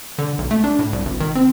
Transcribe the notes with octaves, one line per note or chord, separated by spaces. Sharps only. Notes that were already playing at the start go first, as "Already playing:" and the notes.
D3
B1
A3
D4
A2
C2
G#1
D#3
C4